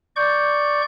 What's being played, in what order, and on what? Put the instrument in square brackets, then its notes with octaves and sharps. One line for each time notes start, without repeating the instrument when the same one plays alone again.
[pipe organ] D5 C#6 G6